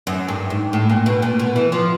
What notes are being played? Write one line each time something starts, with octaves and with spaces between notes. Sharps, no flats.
F#2
G2
G#2
A2
A#2
B2
A#2
B2
E3
F3